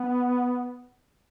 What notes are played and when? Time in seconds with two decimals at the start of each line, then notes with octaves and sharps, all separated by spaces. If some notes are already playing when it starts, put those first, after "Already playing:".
Already playing: B3